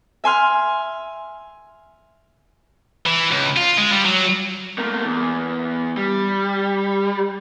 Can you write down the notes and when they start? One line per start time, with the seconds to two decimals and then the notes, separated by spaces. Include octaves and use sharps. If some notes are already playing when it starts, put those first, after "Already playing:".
0.24 E5 G#5 C6 F6
3.06 E3
3.31 C#2
3.57 F4
3.78 G#3
3.92 G3
4.05 F#3
4.78 A3 A#3
5.05 E2
5.97 G3